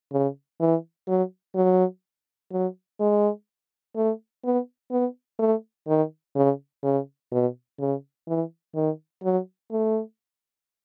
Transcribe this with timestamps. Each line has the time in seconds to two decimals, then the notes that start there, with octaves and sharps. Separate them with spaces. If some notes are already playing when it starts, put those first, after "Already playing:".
0.12 C#3
0.60 E3
1.08 F#3
1.55 F#3
2.52 F#3
3.00 G#3
3.96 A3
4.44 B3
4.91 B3
5.39 A3
5.87 D#3
6.36 C#3
6.84 C#3
7.31 B2
7.80 C#3
8.27 E3
8.75 D#3
9.24 F#3
9.71 A3